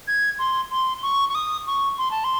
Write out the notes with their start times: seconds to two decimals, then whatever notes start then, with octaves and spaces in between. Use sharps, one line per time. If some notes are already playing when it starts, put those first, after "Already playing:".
0.08 G#6
0.39 C6
0.71 C6
1.02 C#6
1.29 C#6
1.35 D#6
1.67 C#6
1.98 C6
2.11 A5
2.24 C6